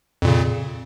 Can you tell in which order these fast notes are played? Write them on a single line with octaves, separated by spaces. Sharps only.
F2 A#2 C#3